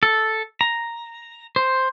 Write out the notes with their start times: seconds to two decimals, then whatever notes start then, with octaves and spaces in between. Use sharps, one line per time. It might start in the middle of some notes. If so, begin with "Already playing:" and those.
0.03 A4
0.61 A#5
1.56 C5